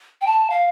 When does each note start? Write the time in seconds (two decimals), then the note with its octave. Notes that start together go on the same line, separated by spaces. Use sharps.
0.21 G5
0.26 A5
0.50 F5